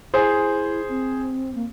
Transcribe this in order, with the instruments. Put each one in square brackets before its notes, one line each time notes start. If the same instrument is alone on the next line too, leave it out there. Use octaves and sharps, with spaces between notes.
[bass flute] E4 [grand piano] G#4 C5
[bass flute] C4
A#3